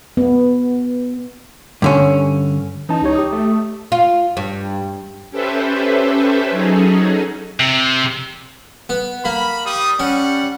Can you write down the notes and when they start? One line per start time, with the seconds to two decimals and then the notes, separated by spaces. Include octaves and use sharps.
0.17 B3
1.82 G2 D3 C#4
2.89 E3 C#4 D#4 A5
3.02 C#2 G4 C#5
3.15 G4 D#6
3.32 A3
3.92 F4
4.37 G2
5.30 C#4 G4 A4 B4 C5 E5
6.50 F#3 C#4 D#4 G#4 A4
7.60 C3
8.89 B3
9.25 A#3 B5
9.66 G3 D#6
9.99 G3 C#4 F#5